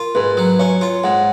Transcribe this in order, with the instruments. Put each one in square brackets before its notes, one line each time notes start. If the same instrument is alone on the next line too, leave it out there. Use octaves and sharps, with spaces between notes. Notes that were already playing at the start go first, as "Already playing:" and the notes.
Already playing: [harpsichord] F4 [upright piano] A#4
[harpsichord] G#2 [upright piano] B4
[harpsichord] F#3
[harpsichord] C#4 [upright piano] C#5
[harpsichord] F4
[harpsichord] G#2 [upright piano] F#5